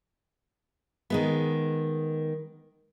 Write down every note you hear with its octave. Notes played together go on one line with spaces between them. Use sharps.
D#3 G#3 B3